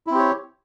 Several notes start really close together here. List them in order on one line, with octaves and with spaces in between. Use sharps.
E4 C4 G4 C#5